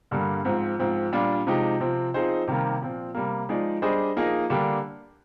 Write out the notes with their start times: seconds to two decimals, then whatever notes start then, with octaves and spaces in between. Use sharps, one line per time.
0.11 G2 D3 G3 A#3
0.45 G#2 F3 C4
0.79 G#2 F3 C4
1.13 A#2 G3 D4 F4
1.47 C3 F3 G#3 D#4 G4
1.80 C3 F3 C4
2.14 F3 C4 D#4 G#4 C5
2.47 C3 D#3 G3 A#3
2.81 A#2 F3 C4
3.15 C3 G3 A#3
3.49 F3 G#3 D#4 G#4 D5
3.82 G3 D4 G#4 C5 D#5
4.17 F3 A#3 D#4 G#4 D#5
4.50 D3 G3 A#3 D4 G4